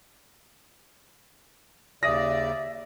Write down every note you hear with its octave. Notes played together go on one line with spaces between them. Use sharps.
D#2 C#3 D5 E5 D#6 A#6